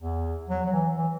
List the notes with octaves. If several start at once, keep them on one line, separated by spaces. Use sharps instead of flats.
E2
F#3
F#3
E3
E3